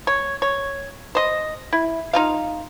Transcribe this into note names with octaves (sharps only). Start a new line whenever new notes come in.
C#5
C#5
C5 D#5
E4
D#4 F4 F5